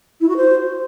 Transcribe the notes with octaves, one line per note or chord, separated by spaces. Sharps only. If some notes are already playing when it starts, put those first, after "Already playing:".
E4
F#4
C5